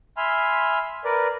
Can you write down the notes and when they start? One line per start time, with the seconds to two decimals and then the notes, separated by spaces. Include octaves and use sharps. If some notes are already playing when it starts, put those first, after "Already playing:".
0.17 E5 G#5 B5 C6 F6
1.04 A#4 B4 D5